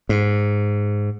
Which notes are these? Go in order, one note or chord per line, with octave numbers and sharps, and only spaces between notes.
G#2